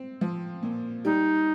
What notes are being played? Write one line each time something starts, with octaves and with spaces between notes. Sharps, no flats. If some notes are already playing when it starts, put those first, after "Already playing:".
Already playing: C4
F3
A#2
G3 D#4